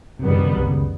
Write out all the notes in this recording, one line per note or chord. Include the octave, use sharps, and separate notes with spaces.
F#2 C3 D#3 G3 B3
C#3
C3
C#3
C2 C3
C#2 C#3